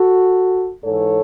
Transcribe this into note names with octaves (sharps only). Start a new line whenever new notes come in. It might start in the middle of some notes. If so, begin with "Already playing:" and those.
Already playing: F#4 A4
G#2 E3 A4 C#5